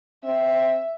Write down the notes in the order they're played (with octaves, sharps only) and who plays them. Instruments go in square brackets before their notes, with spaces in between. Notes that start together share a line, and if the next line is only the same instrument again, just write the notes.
[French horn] C4 [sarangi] E5